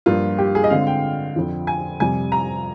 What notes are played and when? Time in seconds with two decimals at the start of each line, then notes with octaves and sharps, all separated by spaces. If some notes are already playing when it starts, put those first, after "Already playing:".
0.06 G2 F3 A#3 F4
0.38 G4
0.55 G#4
0.64 D#5
0.70 D3 G#3 C4 F5
0.87 G5
1.36 F2 D3 F3
1.67 G#5
2.00 F2 C3 G3 G#5
2.32 A#5